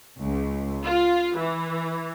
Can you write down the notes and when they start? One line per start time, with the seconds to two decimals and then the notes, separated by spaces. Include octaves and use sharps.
0.22 C#2
0.84 F4
1.37 E3